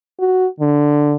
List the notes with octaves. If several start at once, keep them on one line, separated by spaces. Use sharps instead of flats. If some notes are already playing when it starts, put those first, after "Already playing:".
F#4
D3